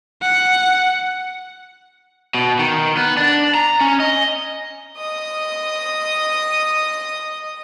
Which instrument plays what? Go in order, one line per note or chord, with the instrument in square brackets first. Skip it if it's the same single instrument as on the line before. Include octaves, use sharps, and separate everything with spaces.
[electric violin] F#5
[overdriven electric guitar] B2
D#3
B3
D4
A#5
C#4
D#5
[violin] D#5 D#6